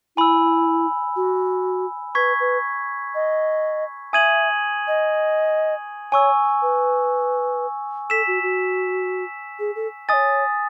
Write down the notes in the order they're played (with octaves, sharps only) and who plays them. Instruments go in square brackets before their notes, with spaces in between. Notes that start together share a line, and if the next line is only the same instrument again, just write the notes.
[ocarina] E4 [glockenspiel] G#5 B5 E6
[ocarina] F#4
[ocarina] B4 [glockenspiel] C#6 G#6 B6
[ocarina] B4
D#5
[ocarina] E5 [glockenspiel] G#5 D#6 G#6 D#7 F#7
[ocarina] D#5
[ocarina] C#5 [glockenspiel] G#5 C#6 E6
[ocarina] B4
[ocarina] A4 [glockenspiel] E6 B6 E7
[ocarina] F#4
F#4
G#4
A4
[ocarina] C#5 D#5 [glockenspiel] G#5 D#6 A6